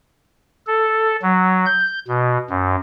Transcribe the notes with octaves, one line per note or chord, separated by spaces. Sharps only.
A4
F#3
G6
B2
F#2